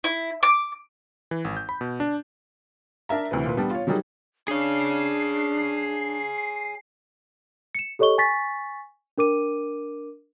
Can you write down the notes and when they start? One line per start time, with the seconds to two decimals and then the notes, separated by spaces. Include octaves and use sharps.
0.04 E4
0.43 D6
1.31 E3
1.45 G#1
1.57 G6
1.69 B5
1.81 B2
2.00 D4
3.09 D4 A#4 E5 A#5
3.31 D2 C3 E3 B4
3.45 A#2 B4
3.57 G3 B3 D4 G4
3.71 F4 C#5
3.87 D#3 F#3 G3 D#4 G#4
4.48 D4 G#4 C#5 C7
7.75 C#7 E7
7.99 G4 A4 C#5 D#5 C#6 G7
8.18 G#5 C#6 A6 B6
9.18 D4 A#4 D6 D#7